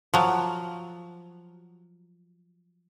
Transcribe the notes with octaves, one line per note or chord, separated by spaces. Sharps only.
F3 F#3